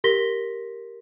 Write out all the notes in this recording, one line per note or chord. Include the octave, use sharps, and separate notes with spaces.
G4 A#4 C6 A#6 B6 G7